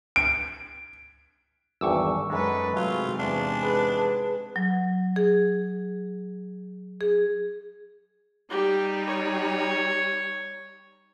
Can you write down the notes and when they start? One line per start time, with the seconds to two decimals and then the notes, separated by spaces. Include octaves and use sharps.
0.16 D7
1.81 G#1 E2 G2 C#6 D6 E6
2.30 F#2 G#3 D#4 A4 B4
2.76 G#2 C3 F#3 A3 F4
3.19 E2 D4
3.62 G#4 B4
4.56 F#3
5.16 G#4
7.01 G#4
8.50 G3 D#4 G4
9.07 C#5